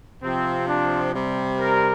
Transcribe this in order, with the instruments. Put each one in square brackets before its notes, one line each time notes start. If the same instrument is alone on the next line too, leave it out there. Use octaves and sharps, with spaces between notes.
[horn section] C3 F3 C4
D4
C3 G3
A#4